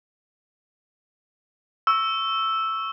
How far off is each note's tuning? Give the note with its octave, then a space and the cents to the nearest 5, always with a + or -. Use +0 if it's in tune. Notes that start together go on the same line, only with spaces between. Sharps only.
C#6 +0 E6 +0